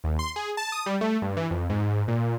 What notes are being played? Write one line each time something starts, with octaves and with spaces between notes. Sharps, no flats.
D#2
C6
G#4
A5
D#6
G3
A3
G2
E3
F2
G#2
A#2